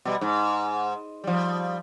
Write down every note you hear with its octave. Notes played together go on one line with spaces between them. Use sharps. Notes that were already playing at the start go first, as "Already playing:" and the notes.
B2 G3
G#2
F3 G3